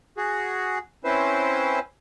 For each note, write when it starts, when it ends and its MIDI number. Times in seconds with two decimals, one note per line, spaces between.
0.17 0.78 66
0.17 0.78 68
1.04 1.79 60
1.04 1.79 61
1.04 1.79 64
1.04 1.79 71
1.04 1.79 72